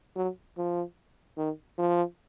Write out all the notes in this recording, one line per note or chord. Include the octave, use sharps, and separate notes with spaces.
F#3
F3
D#3
F3